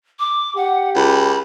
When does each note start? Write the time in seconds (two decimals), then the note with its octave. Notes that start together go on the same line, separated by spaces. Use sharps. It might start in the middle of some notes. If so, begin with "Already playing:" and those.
0.19 D6
0.56 G4 F#5
0.95 C#2 B5